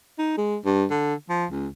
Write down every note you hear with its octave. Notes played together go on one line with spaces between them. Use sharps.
D#4
G#3
G2
D3
F3
C#2